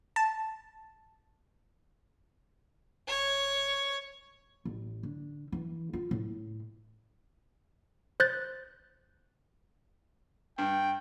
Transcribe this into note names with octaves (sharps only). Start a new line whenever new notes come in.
A5
E1 C#5
A1
D3
E3
F4
A2
C5 F#6 G6 A6
G2 G5